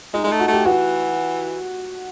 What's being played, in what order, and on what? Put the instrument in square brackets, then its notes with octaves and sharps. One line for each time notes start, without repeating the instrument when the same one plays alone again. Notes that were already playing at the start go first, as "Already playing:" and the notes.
[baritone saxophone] G#3 [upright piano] D#4
[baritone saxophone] G#3
[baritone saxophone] A3 [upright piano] D#4
[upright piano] F#4
[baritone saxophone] A3 [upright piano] G4
[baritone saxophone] E3 [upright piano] F#4